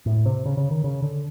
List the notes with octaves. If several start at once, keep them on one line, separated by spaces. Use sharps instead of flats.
A2
C3
C#3
C#3
D#3
C#3
D3